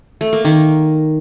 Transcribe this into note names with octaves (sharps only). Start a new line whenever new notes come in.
A3
A#3
D#3